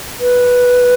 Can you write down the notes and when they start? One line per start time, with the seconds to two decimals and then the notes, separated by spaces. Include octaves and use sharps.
0.20 B4